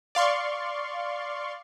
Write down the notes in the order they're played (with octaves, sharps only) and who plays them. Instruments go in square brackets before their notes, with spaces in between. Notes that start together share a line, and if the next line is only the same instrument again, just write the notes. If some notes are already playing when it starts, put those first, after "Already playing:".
[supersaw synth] D5 F5 C6 C#6